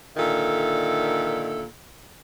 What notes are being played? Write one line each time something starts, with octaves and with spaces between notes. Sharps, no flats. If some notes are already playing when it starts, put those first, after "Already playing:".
A#2 D3 D#3 A4 E5